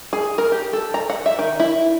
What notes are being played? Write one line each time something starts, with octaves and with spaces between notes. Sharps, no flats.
G#4
A#4
G4
A4
A#5
F#5
E5
D#3
E4